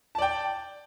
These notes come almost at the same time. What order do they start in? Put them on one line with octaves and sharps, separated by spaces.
A5 D5 G5